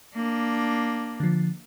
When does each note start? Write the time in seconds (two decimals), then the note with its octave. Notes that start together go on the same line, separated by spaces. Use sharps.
0.15 A#3 D4
1.20 D3 F3